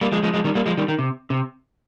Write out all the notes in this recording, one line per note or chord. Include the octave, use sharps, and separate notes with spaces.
G3 A#3
F3 G#3
F3 G#3
F3 G#3
D#3 G3
G3 A#3
F3 G#3
D#3 G3
D#3
C3
C3